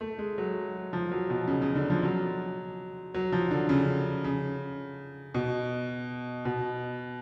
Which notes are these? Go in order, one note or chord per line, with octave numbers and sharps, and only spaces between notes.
A3
G#3
F#3
F3
F#3
B2
C#3
C#3
D3
F3
F#3
F#3
F3
D3
C#3
C#3
B2
B2